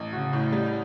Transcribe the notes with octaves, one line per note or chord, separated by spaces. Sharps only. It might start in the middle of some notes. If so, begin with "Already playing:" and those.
Already playing: A1
C#3 F#4
A2
G3